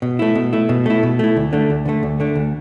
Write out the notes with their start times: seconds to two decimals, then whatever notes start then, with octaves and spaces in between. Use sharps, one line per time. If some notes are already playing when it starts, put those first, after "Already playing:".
0.02 B2
0.19 A3 E4
0.35 B2
0.53 A3 E4
0.69 B2
0.86 A3 E4
1.03 B2
1.19 A3 E4
1.37 D2
1.53 D3 A3
1.70 D2
1.85 D3 A3
2.03 D2
2.20 D3 A3
2.35 D2